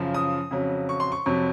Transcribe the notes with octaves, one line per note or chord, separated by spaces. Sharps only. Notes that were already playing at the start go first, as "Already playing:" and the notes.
Already playing: F#2 C#3 F3
D#6
F2 C#3 F#3
C#6
C6
C#6
F2 C3 F#3